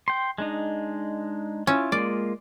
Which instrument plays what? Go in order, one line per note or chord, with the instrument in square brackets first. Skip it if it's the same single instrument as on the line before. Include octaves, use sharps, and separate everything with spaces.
[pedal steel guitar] G5 C6
G#3 D4 D#4
[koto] C#4 [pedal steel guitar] E4 F4
[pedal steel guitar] G#3 A#3 F4 [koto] D5